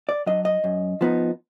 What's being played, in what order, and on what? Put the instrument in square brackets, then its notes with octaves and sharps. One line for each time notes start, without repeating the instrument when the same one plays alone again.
[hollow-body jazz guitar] D5
F#3 D4 D#5
D#5
F#2
F3 B3 D#4